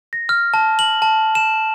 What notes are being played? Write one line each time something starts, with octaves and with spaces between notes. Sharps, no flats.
A#6
F6
A5
F#7
A5
E7